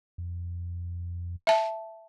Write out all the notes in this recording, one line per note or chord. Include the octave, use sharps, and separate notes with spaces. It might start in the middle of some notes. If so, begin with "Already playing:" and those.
F2
E5 A5